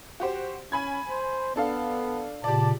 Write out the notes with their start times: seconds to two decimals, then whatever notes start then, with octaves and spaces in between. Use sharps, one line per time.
0.20 F#4 G4 C5
0.72 C#4 G#5 B5 G#6
1.09 C5
1.56 B3 D4 A4 F5
2.44 A#2 C#3 G4 D5 A5